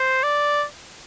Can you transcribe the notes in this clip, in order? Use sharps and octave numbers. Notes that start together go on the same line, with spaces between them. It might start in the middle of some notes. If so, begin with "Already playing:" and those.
Already playing: C5
D5